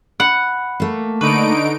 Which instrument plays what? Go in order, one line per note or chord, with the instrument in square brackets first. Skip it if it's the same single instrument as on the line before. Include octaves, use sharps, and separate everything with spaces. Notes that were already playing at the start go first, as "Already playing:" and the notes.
[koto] F#5 [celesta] B5
[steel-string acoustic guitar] A3 A#3
[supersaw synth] D3 D#4 D7 [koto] B4 [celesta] C#6